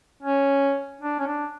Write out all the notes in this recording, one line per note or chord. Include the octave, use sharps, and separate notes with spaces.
C#4
D4
C#4
D4